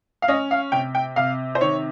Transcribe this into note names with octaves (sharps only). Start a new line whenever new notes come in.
F5
C#4 D#5
F5
C3 G5
G5
C3 F5
C5
D#3 C#5